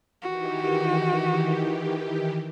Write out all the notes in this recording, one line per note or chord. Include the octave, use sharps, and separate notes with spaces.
D#3 E3 F#4 G4